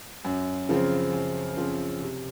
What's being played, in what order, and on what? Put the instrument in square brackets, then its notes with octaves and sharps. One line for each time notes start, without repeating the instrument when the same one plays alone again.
[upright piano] F#2
C#3 F3 C4
F#2
C#3 F3 C4
C3